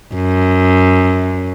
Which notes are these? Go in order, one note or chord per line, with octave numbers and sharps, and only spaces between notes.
F#2